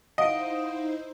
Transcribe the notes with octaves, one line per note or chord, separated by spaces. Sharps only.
D#4 E4 C5 D#5 F5 F#5 D7